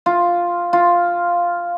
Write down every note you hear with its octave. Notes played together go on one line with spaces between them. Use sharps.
F4
F4